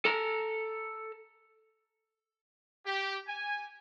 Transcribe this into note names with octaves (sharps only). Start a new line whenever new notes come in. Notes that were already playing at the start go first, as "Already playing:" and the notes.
A4 A#5
G4
G#5